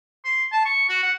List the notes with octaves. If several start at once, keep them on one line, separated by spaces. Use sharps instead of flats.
C6
A5
C#6
F#4
F#5